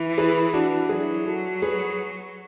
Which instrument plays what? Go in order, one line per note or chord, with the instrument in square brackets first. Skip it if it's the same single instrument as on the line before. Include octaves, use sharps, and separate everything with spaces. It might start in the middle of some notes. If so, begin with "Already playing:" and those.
Already playing: [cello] E3
[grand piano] G#4 B4
D4 F#4
[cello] F#3 [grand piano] E4 G#4
[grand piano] F#4 A4
G#4 B4